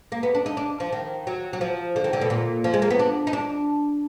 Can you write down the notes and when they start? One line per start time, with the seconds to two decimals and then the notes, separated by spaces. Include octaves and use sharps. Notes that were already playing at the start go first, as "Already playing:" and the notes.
0.12 A#3
0.23 B3
0.35 D4
0.46 D#4
0.57 D4
0.80 F3
0.92 D#3
1.27 F#3
1.53 F#3
1.61 F3
1.96 D3
2.04 D#3
2.13 D3
2.21 B2
2.30 A#2
2.64 F3
2.74 G#3
2.82 A#3
2.91 B3
2.99 D4
3.27 D#4
3.33 D4